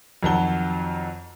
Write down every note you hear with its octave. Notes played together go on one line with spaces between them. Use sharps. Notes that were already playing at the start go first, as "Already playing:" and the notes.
F2 D#3 F#3 F#4 A5 G7